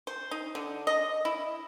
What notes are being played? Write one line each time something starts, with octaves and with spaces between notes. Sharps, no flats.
C5
D#4
D3
D#5
E4